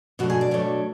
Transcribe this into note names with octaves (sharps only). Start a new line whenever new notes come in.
B2 F#3 A3 D4 F#4
G#4
D5
B2 F#3 A3 D4